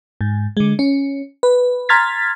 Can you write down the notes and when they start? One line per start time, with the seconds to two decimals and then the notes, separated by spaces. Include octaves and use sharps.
0.21 G#2
0.57 D3 G#3
0.79 C#4
1.43 B4
1.89 A#5 C6 F6 G#6 A6 B6